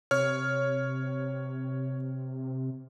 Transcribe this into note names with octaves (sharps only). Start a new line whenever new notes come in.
C3 C#5 F6